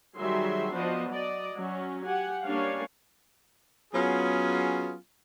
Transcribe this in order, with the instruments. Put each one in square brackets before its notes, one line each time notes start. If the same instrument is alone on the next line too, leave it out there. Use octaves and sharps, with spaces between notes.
[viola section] D#3 F#3 G3 G#4 E5 C6
F3 B3 D4 F#4 C5 D#5
F#3 D5 D#5
F#3 C#4
G4 F#5 G#5
G3 A#3 C#4 D4 C#5 F5
[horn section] F#3 B3 C#4 F4 G#4